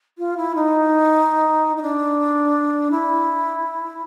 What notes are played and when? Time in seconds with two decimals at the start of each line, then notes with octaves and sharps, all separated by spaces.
0.18 F4
0.37 E4
0.55 D#4
1.76 D#4
1.82 D4
2.91 E4